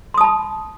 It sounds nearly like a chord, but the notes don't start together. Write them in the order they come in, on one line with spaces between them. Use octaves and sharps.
C6 D#6 A5 B5